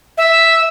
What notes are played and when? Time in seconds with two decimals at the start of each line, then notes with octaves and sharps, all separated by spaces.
0.18 E5